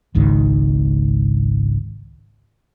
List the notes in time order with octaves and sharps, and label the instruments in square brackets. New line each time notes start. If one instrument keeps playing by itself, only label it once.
[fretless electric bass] G#1 C#2 G#2 D#3